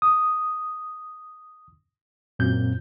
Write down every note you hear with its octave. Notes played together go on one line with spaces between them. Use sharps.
D#6
F#2 A#2 C4 G6